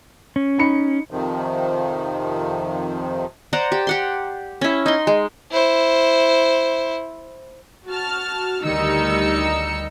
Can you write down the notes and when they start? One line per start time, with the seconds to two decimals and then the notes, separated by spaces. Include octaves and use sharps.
0.36 C#4
0.58 D#4 B5 C#7
1.11 F2 C3 D#3 F3
3.53 C5 D5 F#5 A#5
3.72 G4
3.87 G4 F#5 C6
4.61 C#4 E4
4.86 D#4 C6
5.07 G#3
5.51 E4 C5
7.87 F#4 A5 F6
8.65 D2 D#3 G3 D#4 E6 C#7